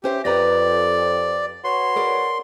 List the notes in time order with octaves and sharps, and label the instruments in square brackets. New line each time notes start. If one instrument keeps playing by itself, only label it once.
[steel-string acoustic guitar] C#4 C5 E5 [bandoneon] G4
[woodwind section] F2 [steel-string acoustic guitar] G4 B4 A#5 [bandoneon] D5
[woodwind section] F#4 B4 C#5 [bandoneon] C6
[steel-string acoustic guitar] G#4 A#4 D5